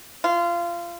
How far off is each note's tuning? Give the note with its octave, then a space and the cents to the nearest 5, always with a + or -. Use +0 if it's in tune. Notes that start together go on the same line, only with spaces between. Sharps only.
F4 -25